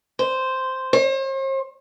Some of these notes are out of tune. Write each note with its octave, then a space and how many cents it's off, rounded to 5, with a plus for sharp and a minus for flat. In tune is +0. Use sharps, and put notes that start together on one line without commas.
C5 -5
C5 +45